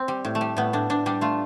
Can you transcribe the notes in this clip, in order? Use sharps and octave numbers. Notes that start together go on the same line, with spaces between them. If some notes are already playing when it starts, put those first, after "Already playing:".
Already playing: C4
G3
A2
A3
G3
A2 B3
A2 D4
A2 D4
G3 D4
A3 F4